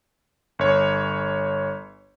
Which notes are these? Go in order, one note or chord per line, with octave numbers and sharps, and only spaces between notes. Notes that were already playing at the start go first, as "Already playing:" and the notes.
G1 C#5